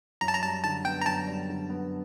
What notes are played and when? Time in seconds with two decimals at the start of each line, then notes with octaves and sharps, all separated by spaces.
0.21 F#2 A#5
0.28 A5
0.35 A#5
0.42 G3 A5
0.64 D3 A5
0.85 B3 G5
1.02 A#5
1.06 F#2 A5
1.27 G3
1.49 D3
1.70 B3